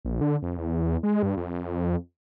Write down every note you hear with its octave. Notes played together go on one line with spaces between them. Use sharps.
A#1
D3
F2
E2
G#3
G2
F2